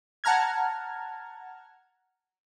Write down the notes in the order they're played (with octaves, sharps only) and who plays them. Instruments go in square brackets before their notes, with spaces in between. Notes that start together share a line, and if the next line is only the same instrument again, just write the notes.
[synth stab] F#5 A5 A#5 F6 G#6